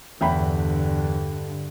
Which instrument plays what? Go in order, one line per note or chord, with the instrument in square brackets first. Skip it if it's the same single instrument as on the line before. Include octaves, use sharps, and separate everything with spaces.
[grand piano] E2 [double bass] G2 D3 [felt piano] E5 G5 B5